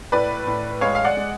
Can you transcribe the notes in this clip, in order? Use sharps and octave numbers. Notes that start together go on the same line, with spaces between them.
A2 B4 D5
A2
G#3 C#5 F5
F5
D5 F#5
G#3